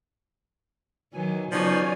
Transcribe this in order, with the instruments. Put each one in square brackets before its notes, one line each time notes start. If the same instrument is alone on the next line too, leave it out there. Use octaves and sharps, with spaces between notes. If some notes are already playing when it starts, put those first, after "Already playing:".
[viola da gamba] D#3 F#3 [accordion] E3 G#5
[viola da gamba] C#3 F#3 [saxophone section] F3 B3 D#4 [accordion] C#5 D5 G#5